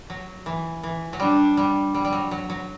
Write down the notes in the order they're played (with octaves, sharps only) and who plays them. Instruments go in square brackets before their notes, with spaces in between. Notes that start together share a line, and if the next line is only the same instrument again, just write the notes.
[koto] F#3
E3
E3
F#3
[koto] G3 [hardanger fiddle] D4
[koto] G3
G3
G3
F#3
F#3
F#3